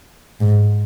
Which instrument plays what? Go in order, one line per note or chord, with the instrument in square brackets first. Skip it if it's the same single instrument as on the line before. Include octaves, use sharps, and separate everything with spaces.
[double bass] G#2